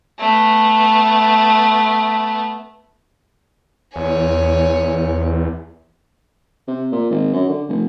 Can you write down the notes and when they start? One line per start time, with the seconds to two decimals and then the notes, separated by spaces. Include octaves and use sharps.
0.19 A3 B3
3.96 E2 C#5 G#5
6.67 C3
6.92 A#2
7.10 G#1
7.33 F#2
7.48 D3
7.68 F1